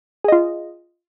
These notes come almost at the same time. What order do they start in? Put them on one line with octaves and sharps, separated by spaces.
G#4 D#5 F4